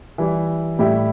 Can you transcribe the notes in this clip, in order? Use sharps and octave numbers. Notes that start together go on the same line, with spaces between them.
E3 G3 E4
A2 G3 E4 G4